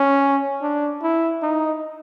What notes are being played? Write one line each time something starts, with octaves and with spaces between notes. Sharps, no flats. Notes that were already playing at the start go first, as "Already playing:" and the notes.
Already playing: C#4
D4
E4
D#4